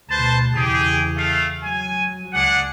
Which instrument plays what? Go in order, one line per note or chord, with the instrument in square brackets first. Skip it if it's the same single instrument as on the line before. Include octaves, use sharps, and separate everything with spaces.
[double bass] D2 B2 [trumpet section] B4 C5 A5
[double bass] E2 C#3 [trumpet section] G4 G#4
[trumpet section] A3 F5
[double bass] F#3 [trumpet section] G#5
[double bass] C#2 [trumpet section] D4 G#4 F#5